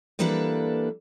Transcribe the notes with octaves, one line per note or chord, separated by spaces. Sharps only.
E3 G3 A#3 D4 A4 B4